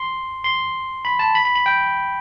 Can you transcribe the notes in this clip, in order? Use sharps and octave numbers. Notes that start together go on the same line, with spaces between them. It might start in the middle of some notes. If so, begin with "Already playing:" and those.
Already playing: C6
C6
B5
A5
B5
B5
B5
G5